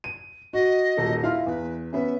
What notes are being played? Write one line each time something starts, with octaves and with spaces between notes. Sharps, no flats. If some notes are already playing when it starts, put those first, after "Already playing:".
D#7
F#4 D#5
D#1 A4
E4 F4 F5
E2 B4
B3 C#4 E5